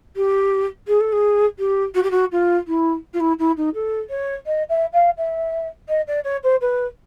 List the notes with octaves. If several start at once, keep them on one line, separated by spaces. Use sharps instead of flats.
G4
G#4
A4
G#4
G4
F#4
G4
F#4
F4
E4
F4
E4
E4
D#4
A4
C#5
D#5
E5
F5
E5
D#5
D5
C#5
C5
B4